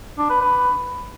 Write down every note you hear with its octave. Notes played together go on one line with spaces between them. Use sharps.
D4
B4
B4